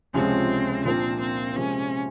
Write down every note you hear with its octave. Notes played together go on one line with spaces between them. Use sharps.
C#2 C3 F3 G#3 C4 C#4
A#2 F3 A#3 C4 D4
C4
C3 F3 G#3 C#4